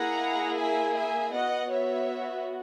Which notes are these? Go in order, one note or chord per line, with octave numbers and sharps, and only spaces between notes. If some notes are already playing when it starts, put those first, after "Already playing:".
Already playing: A#3 E4 G#4 F#5 A#5
E5 G#5
E5 G#5
B3 F#4 D#5 F#5
C#5 E5